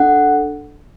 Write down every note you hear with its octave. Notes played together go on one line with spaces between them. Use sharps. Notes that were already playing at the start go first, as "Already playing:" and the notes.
Already playing: D4 A4 F#5